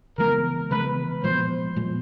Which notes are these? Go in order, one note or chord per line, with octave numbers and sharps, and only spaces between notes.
C#3 E3 G#3 B3 A#4
C#3 E3 G#3 B3 B4
A#2 F3 G#3 B3 C5
A#2 F3 G#3 B3